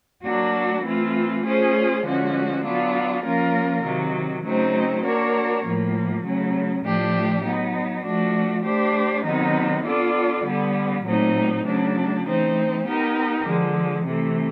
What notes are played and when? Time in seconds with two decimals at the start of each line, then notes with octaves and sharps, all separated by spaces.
0.24 F#3 A#3 D4 F#4
0.84 E3 A3 C4 F4
1.45 A3 C#4 F4 G#4 C5
2.05 D3 F3 G#3 C#4 F#4
2.64 F#3 B3 D4 F4
3.25 F3 A#3 C#4 F4 A#4
3.84 C3 D#3 F#3
4.44 C#3 F#3 A3 C4 D#4
5.04 A#3 D4 F#4 A#4 C#5
5.65 A2 F3 A#3
6.24 C#3 F#3 A3
6.85 A2 F3 A3 D4 G4
7.45 F#3 B3 D#4
8.05 F3 A3 D4 F#4
8.65 A3 D4 G4 C5
9.25 C3 D#3 F#3 B3 D#4
9.85 B3 D4 F4 A4 D5
10.45 D3 G3 B3
11.04 A#2 F#3 A3 C4 D#4
11.65 C#3 F#3 A3 D4
12.25 E3 A3 C4 D#4
12.85 B3 D#4 G4 A#4
13.45 D3 F3 G#3
14.05 C3 E3 A3